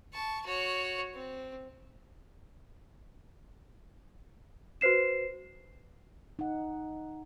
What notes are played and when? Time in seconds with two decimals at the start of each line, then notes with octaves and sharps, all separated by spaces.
0.14 A5 C#6
0.46 F#4 C#5
1.14 C4
4.81 F#4 B4 C5 C7 E7
6.39 D#4 F#5